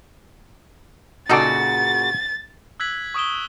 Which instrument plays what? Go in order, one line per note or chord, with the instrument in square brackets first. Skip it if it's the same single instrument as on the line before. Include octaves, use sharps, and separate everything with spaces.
[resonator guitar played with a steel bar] A#2 C#3 F#4 [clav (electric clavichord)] D#4 A4 D5 [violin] A6
[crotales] E6 F#6 G#6 B6 F#7
C#6 D#6 D7 E7 G7